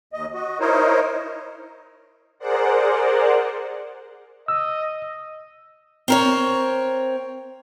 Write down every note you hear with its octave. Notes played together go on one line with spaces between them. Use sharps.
D#2 D#5
F#4 D#5
D#4 E4 A#4 C5 C#5 D#5
G#4 A#4 C5 D5 F#5
D#5 E6
C4 A#4 C#5